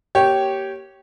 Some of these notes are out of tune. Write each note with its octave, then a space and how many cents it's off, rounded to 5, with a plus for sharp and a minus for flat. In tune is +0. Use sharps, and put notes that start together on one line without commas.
A#3 +5 G4 -15 C#5 -5